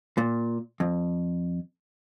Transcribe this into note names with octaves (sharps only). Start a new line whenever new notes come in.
A#2
F2